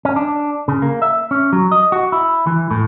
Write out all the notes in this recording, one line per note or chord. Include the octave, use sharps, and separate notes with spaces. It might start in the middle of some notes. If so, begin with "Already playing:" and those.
C#4
D4
C#3
A#3
E5
C#4
F#3
D#5
F#4
E4
E3
A2